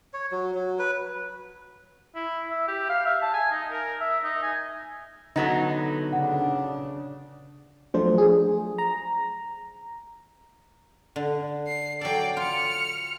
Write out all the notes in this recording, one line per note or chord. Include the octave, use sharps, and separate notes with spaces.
C#5
F#3
F#3
B4
E4
E5
G4
F5
E5
A5
G#5
D#4
A#4
E5
D#4
G#5
D3 F#3 B3 D#4
C#3 D4 F#5
F3 F#3 A3 D4 C5
G#4
A#5
D3
C7
F#3 A4 D5 G5
F4 F6 C#7